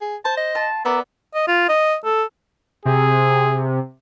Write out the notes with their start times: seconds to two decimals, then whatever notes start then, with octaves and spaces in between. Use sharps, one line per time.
0.01 G#4
0.25 C5 A5
0.37 D#5
0.55 F4 A5
0.85 B3 A#4 D5 E5
1.34 D#5
1.48 F4
1.69 D#5
2.05 A4
2.85 C3 G#4